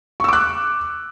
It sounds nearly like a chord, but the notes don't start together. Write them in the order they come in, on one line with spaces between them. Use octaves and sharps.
C#6 E6 D6 F#6